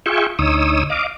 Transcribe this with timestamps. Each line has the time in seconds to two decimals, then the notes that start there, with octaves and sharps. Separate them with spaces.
0.06 F4 G#4 E5 G5 C#6
0.39 D2 D#4 C#5 D#6 E6
0.90 D#5 F5 D6